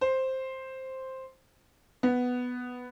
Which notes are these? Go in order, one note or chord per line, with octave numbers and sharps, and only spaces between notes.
C5
B3